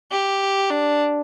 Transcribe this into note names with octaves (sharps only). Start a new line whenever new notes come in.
G4
D4